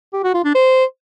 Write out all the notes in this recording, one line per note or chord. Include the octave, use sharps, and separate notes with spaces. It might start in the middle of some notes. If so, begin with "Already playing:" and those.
G4
F#4
F4
D4
C5